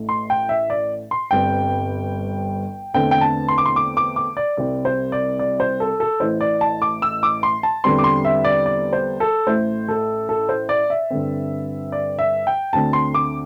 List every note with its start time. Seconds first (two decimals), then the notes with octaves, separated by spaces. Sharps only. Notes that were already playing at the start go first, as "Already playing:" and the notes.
Already playing: A1 A2 A3
0.09 C6
0.30 G5
0.49 E5
0.70 D5
1.11 C6
1.31 G1 G2 G3 C4 G5
2.94 E2 D3 A3 C4 G5
3.11 G5
3.21 A5
3.48 C6
3.58 D6
3.66 C6
3.76 D6
3.97 D6
4.16 D6
4.37 D5
4.57 C2 C3 G3 C4 D5
4.85 C5
5.12 D5
5.39 D5
5.60 C5
5.80 A4
6.00 A4
6.20 A1 A2 E3 C5
6.41 D5
6.61 A5
6.82 D6
7.02 E6
7.23 D6
7.43 C6
7.63 A5
7.84 E2 D3 G3 C4 C6
7.98 D6
8.04 C6
8.25 E5
8.45 D5
8.66 D5
8.93 C5
9.20 A4
9.47 A1 A2 A3 C5
9.88 A4
10.29 A4
10.49 C5
10.69 D5
10.90 E5
11.10 G2 D3 C4
11.92 D5
12.19 E5
12.47 G5
12.73 D2 D3 C4 A5
12.93 C6
13.14 D6